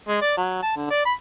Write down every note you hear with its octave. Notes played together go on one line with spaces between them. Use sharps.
G#3
D5
F#3
A5
D3
D5
B5